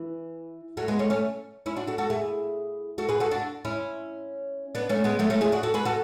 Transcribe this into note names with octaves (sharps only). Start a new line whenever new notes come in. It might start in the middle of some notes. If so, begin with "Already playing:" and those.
Already playing: E3
F#3 A3
G#3 B3
A3 C#4
A3 C#4
C#4 E4
D4 F#4
F#4 A4
F#4 A4
E4 G#4
F#4 A4
G#4 B4
F#4 A4
D4 F#4
C#4 E4
B3 D4
A3 C#4
G#3 B3
F#3 A3
A3 C#4
E4 G#4
D4 F#4
F#4 A4
G#4 B4
F#4 A4